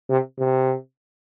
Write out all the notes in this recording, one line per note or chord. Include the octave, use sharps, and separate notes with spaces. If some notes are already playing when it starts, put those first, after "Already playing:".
C3
C3